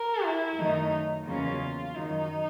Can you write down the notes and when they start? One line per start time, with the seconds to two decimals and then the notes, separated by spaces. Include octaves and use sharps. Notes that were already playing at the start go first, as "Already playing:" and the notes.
Already playing: A#4
0.24 E4
0.59 F#2 D#3 F#3 A3 D#4
1.27 E2 C#3 F#3 A#3 C#4 F4
1.95 F#2 D#3 F#3 D#4